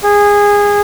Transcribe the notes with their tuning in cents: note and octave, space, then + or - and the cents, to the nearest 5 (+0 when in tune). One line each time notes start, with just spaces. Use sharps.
G#4 -20